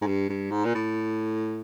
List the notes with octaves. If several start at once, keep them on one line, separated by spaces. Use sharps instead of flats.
G#2
G2
G2
G#2
A#2
A2